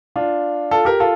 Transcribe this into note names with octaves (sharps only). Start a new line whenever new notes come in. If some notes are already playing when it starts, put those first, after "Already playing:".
D4 F4
F4 A4
G4 A#4
F4 A4